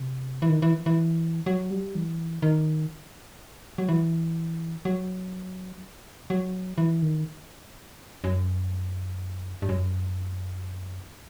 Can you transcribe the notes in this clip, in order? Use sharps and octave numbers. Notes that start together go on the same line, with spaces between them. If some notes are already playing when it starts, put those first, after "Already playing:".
Already playing: C3
E3
D#3
E3
E3
F#3
G3
E3
D#3
F#3
E3
F#3
F#3
E3
D#3
F#2
G2
F#2